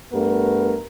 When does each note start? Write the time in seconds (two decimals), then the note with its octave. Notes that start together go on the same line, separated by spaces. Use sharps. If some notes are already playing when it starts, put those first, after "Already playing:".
0.12 G2 A3 B3 A#4